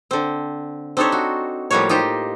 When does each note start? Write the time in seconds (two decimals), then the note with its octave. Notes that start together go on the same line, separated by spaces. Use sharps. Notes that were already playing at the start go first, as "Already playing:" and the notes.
0.11 D3 C4
0.97 C4 D4 D#4 G4 A4 C#5
1.12 F#4
1.71 A2 F3 G3 A#3 F#4 C#5
1.89 D#4 F4 G4 C5